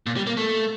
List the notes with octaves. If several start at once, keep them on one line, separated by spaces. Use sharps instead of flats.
A#2
G3
A#3
A3